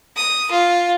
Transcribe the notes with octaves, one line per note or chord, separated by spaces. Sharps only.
D#6
F4